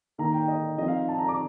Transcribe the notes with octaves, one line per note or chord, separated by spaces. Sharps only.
D#3 A#3 D#4 A#5
G5
D#5
F3 C4 D#4 D#5
F5
A5
A#5
D6